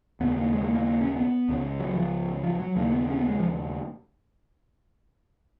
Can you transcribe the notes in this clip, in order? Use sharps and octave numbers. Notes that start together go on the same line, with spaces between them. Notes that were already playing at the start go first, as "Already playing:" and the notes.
D#2 C#3 B3
A#3
G#3
A#3
A#3
A#3
C#4
B3
C#2 C#3
F#3
F3
F3
F#3
D#2 C#3 A#3
B3
C#4
B3
G#3
F3